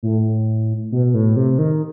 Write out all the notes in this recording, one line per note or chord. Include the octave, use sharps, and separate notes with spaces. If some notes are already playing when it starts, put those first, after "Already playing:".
A2
B2
A2
C3
D#3